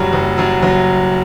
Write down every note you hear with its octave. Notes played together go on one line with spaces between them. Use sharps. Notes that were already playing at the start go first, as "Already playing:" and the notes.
Already playing: F#1 F#2 F#3 G3
F#1
F#2 F#3
F#1 F#3